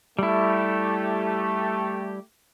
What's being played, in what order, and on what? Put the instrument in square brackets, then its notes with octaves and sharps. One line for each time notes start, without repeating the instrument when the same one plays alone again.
[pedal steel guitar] G3 E4 [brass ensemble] A3 G4